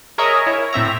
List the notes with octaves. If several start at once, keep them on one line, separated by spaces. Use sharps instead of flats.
G#4 A#4 C#5 D#5 E5 A#5
E4 C#5
A2 C4 E5 A#5